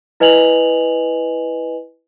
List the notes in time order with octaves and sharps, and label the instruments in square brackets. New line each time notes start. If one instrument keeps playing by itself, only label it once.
[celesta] E4 B4 D#5 G#5 F7 F#7